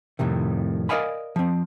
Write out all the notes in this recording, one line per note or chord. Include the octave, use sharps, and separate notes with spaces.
F2 A2 C3 D#3
A#4 D5 D#5 F5 G#5 B5
F3 C4